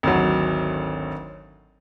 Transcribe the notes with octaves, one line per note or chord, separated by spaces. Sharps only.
G#1 D2 F#3